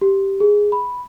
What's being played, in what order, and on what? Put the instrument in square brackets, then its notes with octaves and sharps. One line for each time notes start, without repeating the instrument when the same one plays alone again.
[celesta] G4
G#4
B5